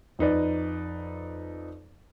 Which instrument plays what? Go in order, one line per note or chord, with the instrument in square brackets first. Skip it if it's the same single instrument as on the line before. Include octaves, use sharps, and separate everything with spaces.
[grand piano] F2 D#4 B4 D5